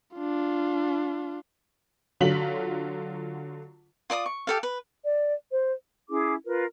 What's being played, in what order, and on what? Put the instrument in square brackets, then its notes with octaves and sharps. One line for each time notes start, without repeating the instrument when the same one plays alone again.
[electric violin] D4 F4
[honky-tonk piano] D3 F#3 F4 B6 F#7
[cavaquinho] F4 D5 A5 D#6
C#6
G4 A4 F5
B4
[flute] D5
C5
[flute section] C#4 E4 G#4 D6
F4 A#4 B4